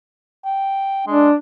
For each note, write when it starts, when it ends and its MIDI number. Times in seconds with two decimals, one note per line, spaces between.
0.45 1.04 79
1.07 1.29 56
1.07 1.34 62